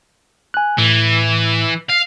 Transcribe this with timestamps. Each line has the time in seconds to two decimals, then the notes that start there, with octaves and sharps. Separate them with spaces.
0.54 G#5 F#6
0.78 A2 E3
1.89 F5